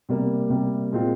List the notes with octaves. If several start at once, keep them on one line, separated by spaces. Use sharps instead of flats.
C3 G3 A#3
C3 G3 A#3
A#2 G#3 C4 F4